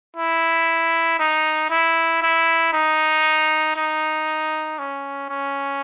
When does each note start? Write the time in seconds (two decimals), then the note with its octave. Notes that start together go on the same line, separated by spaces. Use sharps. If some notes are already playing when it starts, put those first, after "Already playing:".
0.16 E4
1.20 D#4
1.71 E4
2.22 E4
2.73 D#4
3.76 D#4
4.79 C#4
5.30 C#4